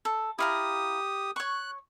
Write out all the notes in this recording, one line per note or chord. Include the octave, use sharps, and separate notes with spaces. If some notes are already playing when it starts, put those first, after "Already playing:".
A4
E4 G4 F5 A#5 D#6
C#5 C#6 F#6